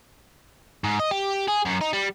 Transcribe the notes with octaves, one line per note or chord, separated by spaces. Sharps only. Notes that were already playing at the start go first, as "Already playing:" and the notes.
G#2
D#5
G4
G#4
F#2
D#4
G3